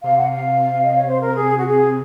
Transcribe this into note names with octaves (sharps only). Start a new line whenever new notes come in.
C3 F5
F#5
F5
D#5
C#5
C5
A#4
G#4
F#4
G#4